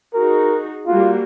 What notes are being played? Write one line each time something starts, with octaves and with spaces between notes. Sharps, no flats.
D#4 F#4 G#4 A#4
G3 A#3 F4 F#4